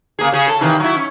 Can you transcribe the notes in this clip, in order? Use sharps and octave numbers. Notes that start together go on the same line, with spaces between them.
C#3 A#3 G#4
C#3 C#4 G#4
A4
C3 D#3 E3
F#3 E4
C#4